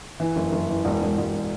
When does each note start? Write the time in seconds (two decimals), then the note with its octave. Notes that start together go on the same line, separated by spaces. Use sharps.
0.20 E3
0.36 F#1
0.52 F#1
0.69 E3
0.85 E1
1.02 E1
1.18 E1